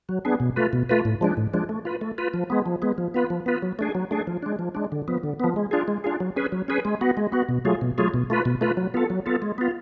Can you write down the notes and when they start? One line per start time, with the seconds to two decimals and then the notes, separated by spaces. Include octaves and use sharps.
0.09 F#3
0.25 B3 D4 G#4
0.40 B2
0.56 A3 F4 B4
0.73 B2
0.89 A3 F4 B4
1.05 A2
1.21 F3 G#3 D4
1.37 A2
1.54 F3 G#3 D4
1.69 A3
1.85 F4 B4
2.01 A3
2.18 F4 B4
2.34 F3
2.50 G#3 B3
2.66 F3
2.82 G#3 B3
2.98 F3
3.14 B3 F4 B4
3.30 F3
3.46 B3 F4 B4
3.62 F#3
3.79 A3 D4 G#4
3.95 F#3
4.11 A3 D4 G#4
4.27 F3
4.43 G#3 D4
4.59 F3
4.75 G#3 D4
4.92 D3
5.08 F3 B3
5.23 D3
5.40 F3 B3
5.56 G#3
5.71 D4 F4 G#4
5.88 G#3
6.04 D4 F4 G#4
6.20 F#3
6.36 C#4 G#4 B4
6.52 F#3
6.68 C#4 G#4 B4
6.85 G#3
7.01 B3 F#4
7.17 G#3
7.32 B3 F#4
7.49 B2
7.65 F#3 A3 F4 G#4
7.81 B2
7.98 F#3 A3 F4 G#4
8.14 B2
8.30 A3 F4 B4
8.45 B2
8.61 A3 F4 B4
8.77 F#3
8.94 B3 F4 A4
9.10 F#3
9.26 B3 F4 A4
9.42 G#3
9.58 B3 F4